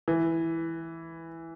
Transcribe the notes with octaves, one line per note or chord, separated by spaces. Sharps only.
E3